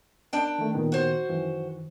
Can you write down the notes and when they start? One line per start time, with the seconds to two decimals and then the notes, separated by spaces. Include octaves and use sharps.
0.33 D4 A#4 G5
0.58 D#3 A3
0.74 A#2 D#3 B3
0.92 F#4 C5
1.29 F#2 D#3 E3